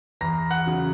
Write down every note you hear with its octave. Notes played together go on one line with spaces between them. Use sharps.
E2 A#5 A#6
F#5 F#6
C#3 F#3